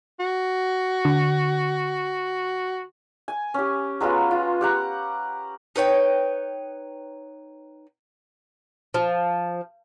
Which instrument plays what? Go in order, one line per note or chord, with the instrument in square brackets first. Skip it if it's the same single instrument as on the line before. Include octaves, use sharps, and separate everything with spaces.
[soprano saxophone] F#4
[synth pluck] D3
[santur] G#5
C#4 G4
F#3 G#3 B3 F4
F4
G4 F#5 A#5
[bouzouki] D#4 B4 C#5 G5
F3